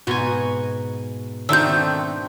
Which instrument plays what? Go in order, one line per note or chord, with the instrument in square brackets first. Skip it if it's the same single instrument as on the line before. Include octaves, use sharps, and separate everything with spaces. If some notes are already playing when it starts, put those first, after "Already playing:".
[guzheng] G#2 B2 D#4 [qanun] F#4 G#5
[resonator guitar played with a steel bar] D#3 A3 C4 [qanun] D4 F#4 [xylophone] E6 G6